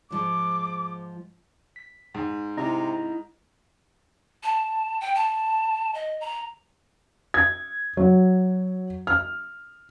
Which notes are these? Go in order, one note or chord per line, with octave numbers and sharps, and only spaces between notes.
G#2 F3 G#3 D6
B6
G#2
C3 E4 D#5 A#5
A5
G5
A5
D#5
A#5
G#6
F#3
F6